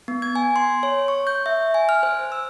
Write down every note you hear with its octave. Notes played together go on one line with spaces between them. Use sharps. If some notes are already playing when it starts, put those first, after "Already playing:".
B3
G#6
G#5
C6
C#5
C#6
G6
E5
G#5
F6
C5
E6